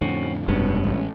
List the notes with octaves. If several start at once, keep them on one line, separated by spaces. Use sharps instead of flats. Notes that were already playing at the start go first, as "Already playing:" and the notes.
F2 A2 D3 C4 C#4 F#4
F1 G2 B2 G#3 B3 C#4
A1